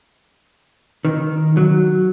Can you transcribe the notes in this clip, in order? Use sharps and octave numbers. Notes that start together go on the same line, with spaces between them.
D#3
F#3